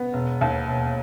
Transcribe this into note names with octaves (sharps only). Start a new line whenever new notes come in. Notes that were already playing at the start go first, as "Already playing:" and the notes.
Already playing: B3
E1
D#2
E1